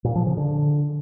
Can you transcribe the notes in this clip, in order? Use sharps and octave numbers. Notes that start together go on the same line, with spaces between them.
A#2
F3
C#3
D3